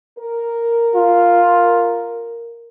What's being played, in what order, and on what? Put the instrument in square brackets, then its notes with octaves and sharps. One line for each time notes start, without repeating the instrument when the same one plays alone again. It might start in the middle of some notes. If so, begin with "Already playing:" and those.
[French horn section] A#4
[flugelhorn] F4